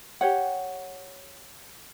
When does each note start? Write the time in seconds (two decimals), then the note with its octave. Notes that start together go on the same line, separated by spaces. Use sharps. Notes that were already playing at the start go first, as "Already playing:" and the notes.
0.21 G4 C#5 F#5